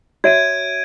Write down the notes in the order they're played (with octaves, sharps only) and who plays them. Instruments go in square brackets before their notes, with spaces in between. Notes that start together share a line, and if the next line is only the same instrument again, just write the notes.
[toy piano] F#4 C#5 E5 [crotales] G#6 D7 D#7